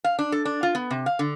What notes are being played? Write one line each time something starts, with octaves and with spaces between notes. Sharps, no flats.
F5
D4
A4
D4
F4
B3
C3
F5
D3